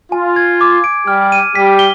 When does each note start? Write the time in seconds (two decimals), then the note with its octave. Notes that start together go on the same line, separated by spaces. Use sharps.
0.12 F4 G#5
0.36 G#6
0.61 D6
0.84 D7
1.08 G3 G4 F6
1.32 D#7
1.55 G3 G4 B6
1.79 G7